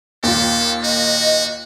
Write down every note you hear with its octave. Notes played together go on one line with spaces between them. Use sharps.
D#2 A#2 A4
F#4 D#5